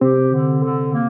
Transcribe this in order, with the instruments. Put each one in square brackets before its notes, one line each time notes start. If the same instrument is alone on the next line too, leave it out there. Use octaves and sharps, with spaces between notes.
[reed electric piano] C3 C4 [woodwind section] G4
[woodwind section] D3
D3
A#3